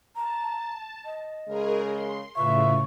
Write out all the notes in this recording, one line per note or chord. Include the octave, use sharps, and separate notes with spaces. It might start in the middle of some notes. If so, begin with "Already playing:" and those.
A5 A#5
D#5
C#3 G#3 G#4 A#4
C6
A2 C#3 F4 B4 E5 C#6